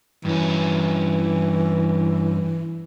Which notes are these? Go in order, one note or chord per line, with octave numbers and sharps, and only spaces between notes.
G2 E3 C#4